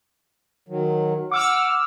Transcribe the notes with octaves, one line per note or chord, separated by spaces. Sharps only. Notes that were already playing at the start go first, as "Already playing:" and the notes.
D#3 F#3
F#5 D6 E6 F6